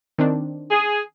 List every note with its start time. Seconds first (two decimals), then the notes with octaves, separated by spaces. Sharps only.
0.18 D#3 C4 D4
0.70 G#4